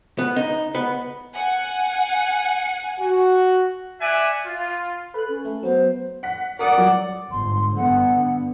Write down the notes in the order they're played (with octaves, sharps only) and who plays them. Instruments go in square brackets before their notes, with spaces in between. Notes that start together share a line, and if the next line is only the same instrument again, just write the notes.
[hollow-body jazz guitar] B3
D#4
B3
[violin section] F#5 [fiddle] G#5
[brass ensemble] F#4
[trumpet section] D5 E5 F#5 G#5
F4
[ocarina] A4 [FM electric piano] B4 F#6
[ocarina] C#4
[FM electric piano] A3
[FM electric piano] F#3 B3 [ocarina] C5
[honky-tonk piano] F#5 B6
[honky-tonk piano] A#4 D#6 [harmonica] D5 F#5
[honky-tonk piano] F#3
[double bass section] G1 G#2 [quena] C6
[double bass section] G2 D3 B3 [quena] F#5